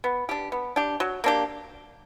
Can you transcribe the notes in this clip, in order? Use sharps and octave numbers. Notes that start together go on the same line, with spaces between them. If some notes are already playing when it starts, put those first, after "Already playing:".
B3
D4 G4
B3
D4 G4
F#3
A#3 D4 G4